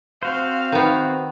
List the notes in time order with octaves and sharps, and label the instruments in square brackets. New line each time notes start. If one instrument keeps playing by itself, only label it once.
[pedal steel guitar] C4 F#4 C5 [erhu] F5
[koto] D#3 B3